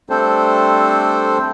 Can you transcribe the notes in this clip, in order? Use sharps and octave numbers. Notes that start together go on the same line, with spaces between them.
G3 A3 C4 D4 A4 C5